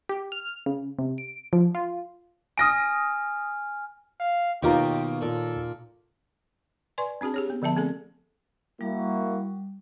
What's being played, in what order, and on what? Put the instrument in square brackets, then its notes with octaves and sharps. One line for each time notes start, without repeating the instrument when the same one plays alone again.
[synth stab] G4
F6
C#3
C3
D7
F3
F4
[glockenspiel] G#5 F6 [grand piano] D#6 A#6 D7
[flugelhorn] F5
[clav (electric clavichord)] D#2 [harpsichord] B2 A#3 A#4 [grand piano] D#4 F4 A#5 [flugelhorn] G4
[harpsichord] A#2 [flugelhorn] A4
[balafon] B4 D5 G#5 C6 C#6
C4 D4 F#4 G#4 A5
G4 G#4 C#5
A#3 B3
D3 F3 B3 E5 A5
A3 C4 G#4 A4
[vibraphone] G3 [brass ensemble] A#3 E4 F#4